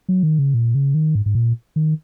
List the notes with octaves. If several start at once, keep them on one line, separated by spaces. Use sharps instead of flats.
F#3
D#3
C#3
A#2
C#3
D#3
G#2
G#2
A#2
D#3